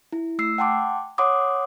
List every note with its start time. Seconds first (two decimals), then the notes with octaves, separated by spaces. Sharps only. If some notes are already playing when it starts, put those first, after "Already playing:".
0.13 E4
0.38 A3 E6 C7
0.58 F#5 G5 A5 C6 D6
1.18 C#5 F#5 C6 D6 D#6